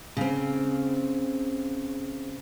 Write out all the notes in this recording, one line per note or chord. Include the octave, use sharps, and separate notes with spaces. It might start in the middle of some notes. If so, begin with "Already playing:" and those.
C#3 C4